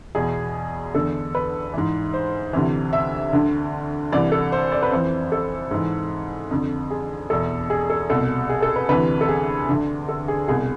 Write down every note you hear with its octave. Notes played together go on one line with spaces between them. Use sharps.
E2 B2 G#4
E2 D3 A4
B4
G#2 E3
C5
D2 C3 E3
E5
D2 D3
C2 C3 E3 D5
A4
C5
D5
B4
F2 E3 C5
A4
G#2 E3
F2 D3
G#4
E2 B2 A4
G#4
A4
C2 B2 A4
G#4
A4
B4
D2 C3 E3 B4
A4
G#4
D2 D3
A4
G#4
C2 B2 G#4